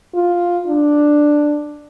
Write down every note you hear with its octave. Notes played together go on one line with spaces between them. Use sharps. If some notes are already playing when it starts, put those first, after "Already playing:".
F4
D4